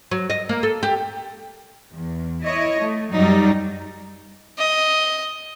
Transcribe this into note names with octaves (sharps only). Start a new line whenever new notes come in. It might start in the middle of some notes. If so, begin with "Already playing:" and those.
F#3
D#5
A#3
A4
G4
E2
E4 C#5 D#5
A3
F#2 F#3 G3 D#4
D#5